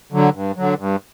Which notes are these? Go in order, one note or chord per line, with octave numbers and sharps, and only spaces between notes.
D3 F#3
G2
D3 F#3
G2